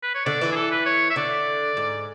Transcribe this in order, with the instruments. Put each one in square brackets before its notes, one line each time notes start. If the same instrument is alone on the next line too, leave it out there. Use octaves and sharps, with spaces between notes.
[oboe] B4
C#5
[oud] D3 [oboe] D5
[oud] E3
[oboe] G#4
A4
B4
C#5
E5
[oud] D3 [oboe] D5
[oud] G#2